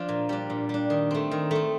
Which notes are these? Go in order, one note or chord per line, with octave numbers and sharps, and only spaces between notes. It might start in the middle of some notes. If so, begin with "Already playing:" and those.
Already playing: F3 D4 F4
A#2
G3 D4
A#2
G3 D4
D#3
A3 C4
D#3
A3 C4